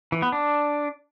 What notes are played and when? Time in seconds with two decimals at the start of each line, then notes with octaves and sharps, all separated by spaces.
0.12 E3
0.22 B3
0.32 D4